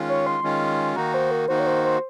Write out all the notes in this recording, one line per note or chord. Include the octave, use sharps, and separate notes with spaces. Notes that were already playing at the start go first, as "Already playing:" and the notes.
Already playing: D#3 G#3 C#4 F4
C#5
C6
D#3 G#3 C#4 F4
D#3 A#3 D#4 F#4 A#5
C5
A#4
D#3 A#3 D#4 F#4 C5
C#5
C5
C5